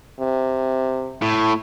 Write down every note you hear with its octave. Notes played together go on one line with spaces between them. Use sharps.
C3
A2